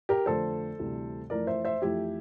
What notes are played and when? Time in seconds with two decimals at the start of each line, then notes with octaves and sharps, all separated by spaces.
0.09 G4 A#4
0.26 F2 D3 A3 A4 C5
0.79 D2 C3 E3 G3
1.30 F2 E3 A3 A#4 D5
1.47 C5 E5
1.65 C5 E5
1.82 F2 E3 A3 E4 G4